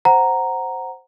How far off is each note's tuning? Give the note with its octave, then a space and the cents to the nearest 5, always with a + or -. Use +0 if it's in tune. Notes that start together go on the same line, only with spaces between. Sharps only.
C5 +0 F#5 +5 A#5 +0